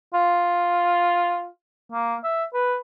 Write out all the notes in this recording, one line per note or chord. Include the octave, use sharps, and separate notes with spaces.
F4
A#3
E5
B4